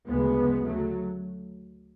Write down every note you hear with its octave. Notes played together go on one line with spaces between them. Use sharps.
D2 C#3 G#3 B3
F#2 C#3
D2 C#3 F#3 A3